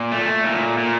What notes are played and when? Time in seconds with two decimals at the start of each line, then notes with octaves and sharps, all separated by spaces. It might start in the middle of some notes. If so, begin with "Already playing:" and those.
Already playing: A#2
0.12 A3
0.44 A#2
0.78 A#2